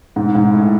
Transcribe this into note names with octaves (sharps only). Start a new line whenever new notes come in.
G#2
G#2
A2